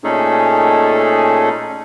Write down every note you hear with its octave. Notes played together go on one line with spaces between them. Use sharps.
A#2 A3 C#4 D#4 G#4 A4